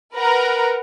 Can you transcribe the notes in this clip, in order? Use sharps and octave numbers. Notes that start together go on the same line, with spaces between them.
A#4 B4 F#5 A#5